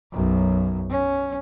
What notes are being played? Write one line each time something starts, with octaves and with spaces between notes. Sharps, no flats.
B1 F#2
C#4